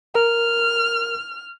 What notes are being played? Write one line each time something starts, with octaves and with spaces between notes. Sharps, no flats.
A#4 F6